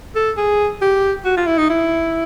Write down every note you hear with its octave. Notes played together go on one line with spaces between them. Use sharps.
A4
G#4
G4
F#4
F4
E4
D#4
E4